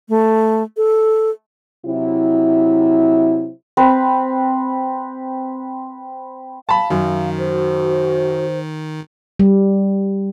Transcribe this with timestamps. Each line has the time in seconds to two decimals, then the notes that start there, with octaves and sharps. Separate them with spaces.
0.09 A3
0.77 A4
1.86 C3 F#3 E4
3.77 C4 B4
6.69 F5 A5 B5
6.90 F#2 D#3
7.38 F#4 C5
9.40 G3